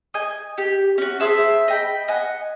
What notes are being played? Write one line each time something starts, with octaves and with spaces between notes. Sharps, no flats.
D#5 G#5
G4
C#4 F#4
G#4 C5 E5 A5
D#5 G5 B5
D#5 F#5 G#5